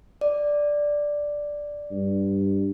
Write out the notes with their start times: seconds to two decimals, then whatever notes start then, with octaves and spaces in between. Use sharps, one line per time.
0.21 D5
1.91 G2